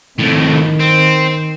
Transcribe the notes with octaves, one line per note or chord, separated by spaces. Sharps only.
F2 A2 D#3
C4